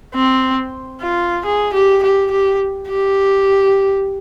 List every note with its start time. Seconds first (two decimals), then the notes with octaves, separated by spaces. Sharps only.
0.15 C4
1.02 F4
1.45 G#4
1.73 G4
2.03 G4
2.31 G4
2.89 G4